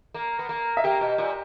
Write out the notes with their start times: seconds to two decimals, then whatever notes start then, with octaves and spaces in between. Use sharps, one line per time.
0.14 A#3
0.39 B3
0.49 A#3
0.77 E5
0.84 A#3 G4 G5
1.01 B2
1.18 A#2